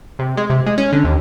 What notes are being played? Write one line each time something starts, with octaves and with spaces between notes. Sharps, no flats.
C3
G#3
C3
G#3
C#4
D3
D#2